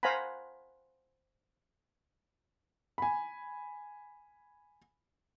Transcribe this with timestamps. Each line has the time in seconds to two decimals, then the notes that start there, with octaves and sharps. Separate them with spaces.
0.03 C5 F5 F#5 G#5 A#5 B5
2.98 G#5 B5